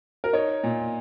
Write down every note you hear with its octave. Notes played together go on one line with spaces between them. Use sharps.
A#4
D#4 C#5
A#2